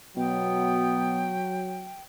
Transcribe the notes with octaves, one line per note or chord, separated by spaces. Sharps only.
B2 F#3 B3 G5